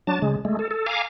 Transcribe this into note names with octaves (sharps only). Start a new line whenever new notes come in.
F#3 D4 A5
C#3 G#3
G#3 A3
A4
A4
F5 G#5 A#5 D6